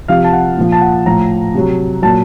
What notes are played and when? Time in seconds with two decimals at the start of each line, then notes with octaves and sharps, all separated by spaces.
0.08 C3 F3 F5
0.24 A5
0.33 F#5
0.57 A#2 F3
0.72 A5
0.81 F#5
1.06 A2 F3 A#5
1.54 C3 F#3
2.02 A#2 F#3 A5